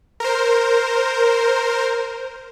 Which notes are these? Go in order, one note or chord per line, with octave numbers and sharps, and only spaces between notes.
A#4 C5